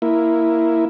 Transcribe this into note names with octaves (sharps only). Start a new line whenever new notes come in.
A#3 E4